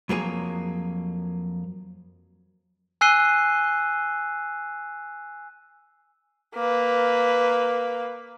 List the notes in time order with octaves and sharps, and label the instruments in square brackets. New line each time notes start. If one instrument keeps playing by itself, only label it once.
[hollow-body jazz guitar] F2 F#3 A#3 G#4
[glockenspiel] G#5 E6 F#6 C7 D#7 G7
[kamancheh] A#3 B4